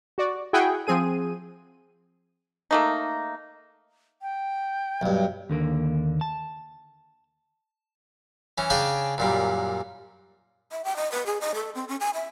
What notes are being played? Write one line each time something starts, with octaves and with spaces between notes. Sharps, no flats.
F#4 D5
E4 F#4 G#4 F#5 G5
F3 C4 G#4 D#7
A3 A#3 D#4
G5
B1 G2
D#2 D3 A#3
A5
E3 C#4
C#3 D4 D5 G5 G#5
F#2 A#2 G3
E5
G5
D#5
B4
G#4
D#5
A4
C4
C#4
G#5
E5